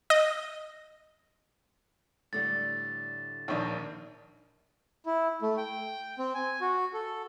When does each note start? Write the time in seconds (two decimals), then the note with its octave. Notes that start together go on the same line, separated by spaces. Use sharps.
0.10 D#5
2.33 A2 D3 G3 A6
3.48 A#1 D#2 C#5 D5
5.06 E4
5.42 A3
5.57 G5
6.18 C4
6.35 G#5
6.61 F#4
6.94 A4